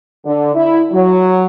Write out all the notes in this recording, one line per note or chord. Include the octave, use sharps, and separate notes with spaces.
D3
E4
F#3